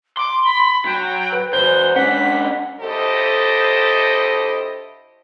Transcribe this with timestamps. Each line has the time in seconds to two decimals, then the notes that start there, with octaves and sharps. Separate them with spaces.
0.17 C6 D6
0.44 B5
0.85 F#3 G5
1.32 B4
1.53 E2 F#4 B4 C5 G6 G7
1.96 G#2 C#4 D4 F#5 B6
2.81 D2 E4 G4 A4 C5 D#5